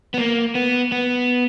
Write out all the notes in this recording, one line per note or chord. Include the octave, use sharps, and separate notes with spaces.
B3
A#3
B3
B3